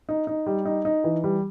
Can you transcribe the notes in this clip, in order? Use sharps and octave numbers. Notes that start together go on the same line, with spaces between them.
D#4
D#4
G3
D#4
D#4
E3
G3